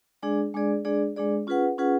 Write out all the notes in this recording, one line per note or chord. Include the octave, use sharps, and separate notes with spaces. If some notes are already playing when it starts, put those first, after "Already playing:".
G#3 D4 G#4 D5
G#3 D4 G#4 D5
G#3 D4 G#4 D5
G#3 D4 G#4 D5
C#4 F4 G#4 B4 F#5
C#4 F4 G#4 B4 F#5